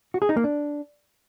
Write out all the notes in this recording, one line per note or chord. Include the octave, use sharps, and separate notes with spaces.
F#4
G#4
D#4
A#3
D4